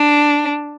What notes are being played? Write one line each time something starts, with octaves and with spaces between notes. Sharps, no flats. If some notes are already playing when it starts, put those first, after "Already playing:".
Already playing: D4